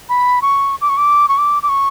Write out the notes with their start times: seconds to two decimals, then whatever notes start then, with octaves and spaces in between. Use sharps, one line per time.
0.09 B5
0.42 C#6
0.81 D6
0.89 C#6
0.97 D6
1.28 C#6
1.38 D6
1.63 D6
1.69 C#6